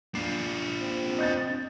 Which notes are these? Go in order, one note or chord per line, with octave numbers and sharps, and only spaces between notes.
D4 F4 C7
C4
D#5 G6 A6